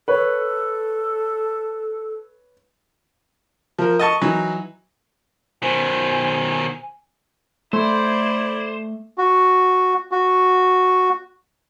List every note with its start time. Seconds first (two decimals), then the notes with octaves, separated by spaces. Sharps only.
0.08 A4 B4 C#5
3.78 F3 A#4
3.99 D#5 A5 C#6
4.21 E3 F#3 D#4
5.62 B2 D#3 C5 G#5
7.73 A3 E4 C5 D5
9.18 F#4
10.11 F#4